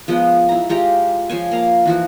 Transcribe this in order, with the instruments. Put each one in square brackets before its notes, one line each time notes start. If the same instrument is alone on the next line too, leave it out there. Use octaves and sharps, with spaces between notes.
[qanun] F3 G#3 B3
E4 A#5
G#3 F4 G4 A#5
F3 C5 C#5 G#5
A#3 F5 A#5
E3 F3 F#4